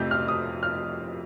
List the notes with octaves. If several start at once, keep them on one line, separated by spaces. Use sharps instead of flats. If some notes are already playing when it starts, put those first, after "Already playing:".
Already playing: F2 C3 F3 A3 G6
F6
D#6
F6